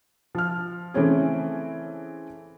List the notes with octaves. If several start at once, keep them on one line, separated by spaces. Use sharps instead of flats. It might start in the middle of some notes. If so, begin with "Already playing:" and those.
F3 F6
C#3 E3 A3 C4 C#4 G#4